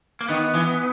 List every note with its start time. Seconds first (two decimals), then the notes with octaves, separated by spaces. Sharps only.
0.21 A#3
0.28 D#3 B3
0.54 E3